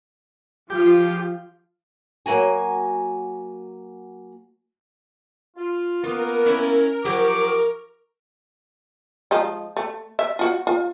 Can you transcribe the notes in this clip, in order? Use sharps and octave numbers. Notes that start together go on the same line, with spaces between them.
F3 F4 G4
F#3 A#3 F#4 G#5
F4
A#3 B3 F4 A#4
C#4 E4
F3 F#3 F#4 G4 C#6 D6
F3 G#3 D#4
A3
E5
F4 F#4 F#5
F4